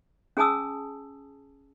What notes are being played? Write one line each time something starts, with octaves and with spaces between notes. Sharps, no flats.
C#4 G#4 G#5 A5 D#6 E6